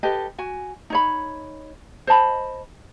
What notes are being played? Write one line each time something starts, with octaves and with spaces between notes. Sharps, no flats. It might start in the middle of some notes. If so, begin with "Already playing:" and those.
G4 A4 B4 D#5
F#4 G#5
D#4 C#5 B5
C5 D#5 A5 B5